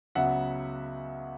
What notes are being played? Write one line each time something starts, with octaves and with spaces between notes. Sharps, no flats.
C#2 C#3 F#3 B3 E5 F#5